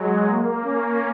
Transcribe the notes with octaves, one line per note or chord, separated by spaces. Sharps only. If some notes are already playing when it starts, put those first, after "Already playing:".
Already playing: F#3 G#3
A#3
C#4